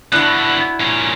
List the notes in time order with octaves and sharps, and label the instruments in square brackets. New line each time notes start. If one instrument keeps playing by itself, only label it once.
[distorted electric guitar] D3 B3 [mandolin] D4 F#4 [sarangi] E4
[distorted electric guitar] A#2 C#4